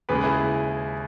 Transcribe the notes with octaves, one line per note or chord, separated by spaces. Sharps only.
D#2 C#3 G#3 G#4 B4
E4 G#4